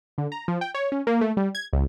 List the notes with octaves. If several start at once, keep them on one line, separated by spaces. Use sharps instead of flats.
D3
A#5
F3
G5
C#5
C#4
A#3
A3
G3
G#6
C#2